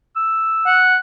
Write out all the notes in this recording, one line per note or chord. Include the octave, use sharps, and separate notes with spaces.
E6
F#5